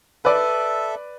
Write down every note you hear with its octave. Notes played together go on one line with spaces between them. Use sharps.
A4 B4 D5 E5